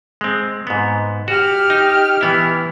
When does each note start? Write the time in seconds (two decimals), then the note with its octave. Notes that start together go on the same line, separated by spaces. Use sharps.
0.21 G#3 C4
0.67 G#2 B3
1.28 F#4 G4 F6
1.70 D#4
2.21 E3 B3 E4